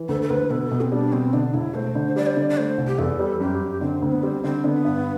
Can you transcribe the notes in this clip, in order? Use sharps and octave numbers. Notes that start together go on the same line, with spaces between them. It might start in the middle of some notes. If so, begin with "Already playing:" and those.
Already playing: E3
D2 A4
A4
D2 B4
B2 A4
B2
C4
G3 D4
B2 C4
D3 D4
E1 E4
A3 C5
D3
G3 D5
C5
D3 D5
D5
A3 C5
C2
G4
E2 A4
G3
F#2 G4
F#2
D3 C4
D2
B3
G3 C4
D3 C4
D3 B3
G2